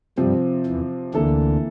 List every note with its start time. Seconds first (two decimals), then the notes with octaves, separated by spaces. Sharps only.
0.17 G2 C3 F3 G3 C4
0.66 E2 E3
1.14 D2 D3 E3 A#3 E4 A4